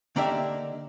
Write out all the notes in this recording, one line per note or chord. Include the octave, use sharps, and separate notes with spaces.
D3 A#3 D4 D#4 G4 E5